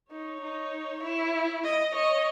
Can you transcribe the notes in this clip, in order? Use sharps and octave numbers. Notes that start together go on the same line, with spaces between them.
D#4 C#5
D#4
E4
D#5
C#5 D#5